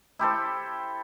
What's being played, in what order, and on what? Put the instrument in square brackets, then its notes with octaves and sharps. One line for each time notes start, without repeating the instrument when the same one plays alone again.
[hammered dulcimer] E4 G4 A4 C5